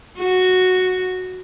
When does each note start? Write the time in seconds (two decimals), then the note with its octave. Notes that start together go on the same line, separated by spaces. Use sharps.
0.19 F#4